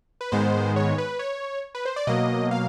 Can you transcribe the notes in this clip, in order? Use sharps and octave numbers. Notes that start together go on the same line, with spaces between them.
B4
G#2 D#3 G#3 B3 C5
C#5
B4
C#5
B4
C5
D5
B2 F#3 A#3 D#5
F5